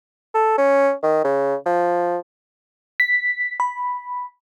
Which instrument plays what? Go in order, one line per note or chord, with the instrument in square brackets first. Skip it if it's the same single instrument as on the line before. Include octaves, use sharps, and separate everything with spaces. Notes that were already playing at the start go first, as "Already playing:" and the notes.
[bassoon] A4
C#4
D#3
C#3
F3
[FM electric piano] B6
B5